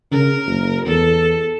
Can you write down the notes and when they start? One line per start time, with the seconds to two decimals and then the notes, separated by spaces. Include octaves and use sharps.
0.12 C#3 A#4
0.46 F#1
0.86 E2 A4